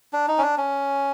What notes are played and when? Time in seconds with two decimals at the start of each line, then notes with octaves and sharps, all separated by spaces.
0.13 D4
0.28 D#4
0.38 C#4
0.42 D4
0.58 C#4